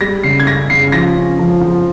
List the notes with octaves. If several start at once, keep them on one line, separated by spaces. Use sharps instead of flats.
G3 A#6
C#3 C7
G#6
C#4 A#6
C#3 C7
F3 A#6
C#4
F3
F3